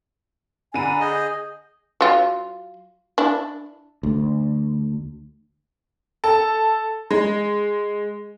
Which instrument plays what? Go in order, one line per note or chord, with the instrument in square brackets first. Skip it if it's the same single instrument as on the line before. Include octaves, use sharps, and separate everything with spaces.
[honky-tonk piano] D3 D#7 [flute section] G#5 A#5 B5
[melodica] G#4 D#5 [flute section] G6
[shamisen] F#3 F4
D4 E4
[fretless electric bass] D2
[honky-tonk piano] A4
G#3